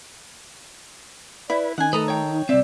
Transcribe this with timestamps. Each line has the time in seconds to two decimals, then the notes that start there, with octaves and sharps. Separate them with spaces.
1.50 E4 B4 D5
1.78 D#3 C#4 F#5 G#5
1.93 A3 A4 B4 A#5 D#6
2.08 C#5 G5
2.30 D#4
2.49 C2 C4 D5 E5